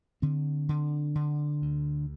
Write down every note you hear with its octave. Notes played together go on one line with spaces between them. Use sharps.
D3 C4
D3
D3
D2